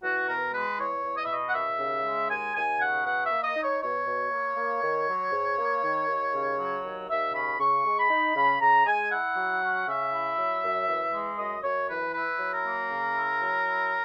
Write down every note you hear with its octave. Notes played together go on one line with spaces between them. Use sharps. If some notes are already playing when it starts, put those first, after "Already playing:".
E2 F#4
B2 A#4
G#3 B4
E2 C#5
E2
D#5
E5
B2 D#5
F#5
D#2 E5
C#3
G#3
D#2 G#5
D#2 G#5
C#3 F#5
B2 F#5
E5
A#3
D#5
D#4
C#5
B2 C#5
B2
A#3
A#3
D#3
F#3
G#2
A#3
D#3
D#2
C#3
F#3
D#2
D#2 E5
C#3 B5
C#3 C#6
G#3
B5
D#4
C#3 B5
C#3 A#5
G#3 G#5
E4 F#5
F#3
C#4
C#3 E5
E4
F#3
F#2
E3
G#3
F#2 D#5
F#2 C#5
E3 B4
E4 B4
F#3
A#4
A#3
C#3
E4
F#3
E4